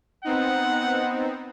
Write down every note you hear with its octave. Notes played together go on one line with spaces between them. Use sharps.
B3 C4 D#4 F#5